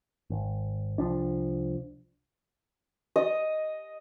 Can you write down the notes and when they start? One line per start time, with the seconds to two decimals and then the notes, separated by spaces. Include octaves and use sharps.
0.30 G#1
0.98 C2 F3 D4
3.16 D#5